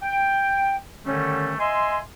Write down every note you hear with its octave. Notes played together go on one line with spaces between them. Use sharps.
G5
D3 D#3 G3 A3 C#4
D#5 E5 G#5 C6